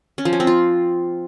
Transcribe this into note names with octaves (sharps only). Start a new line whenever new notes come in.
C#4
F3
C#4
C4
F4